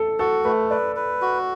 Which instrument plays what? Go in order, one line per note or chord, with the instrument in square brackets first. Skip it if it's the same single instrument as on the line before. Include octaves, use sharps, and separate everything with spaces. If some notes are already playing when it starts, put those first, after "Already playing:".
Already playing: [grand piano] A4
[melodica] F#4 [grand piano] A4
[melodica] A3 [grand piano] B4
[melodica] B4 [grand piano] D5
[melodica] B4
F#4